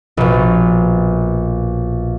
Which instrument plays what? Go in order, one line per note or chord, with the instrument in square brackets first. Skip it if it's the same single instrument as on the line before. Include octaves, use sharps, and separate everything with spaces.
[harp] A#1 B2